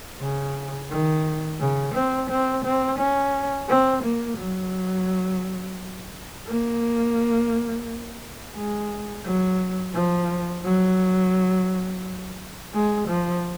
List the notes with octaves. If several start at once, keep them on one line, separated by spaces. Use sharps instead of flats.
C#3
D#3
C#3
C4
C4
C4
C#4
C4
A#3
F#3
A#3
G#3
F#3
F3
F#3
G#3
F3